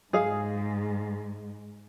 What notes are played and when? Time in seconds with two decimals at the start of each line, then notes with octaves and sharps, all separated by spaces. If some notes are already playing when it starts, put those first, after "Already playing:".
0.13 G#2 G#4 F5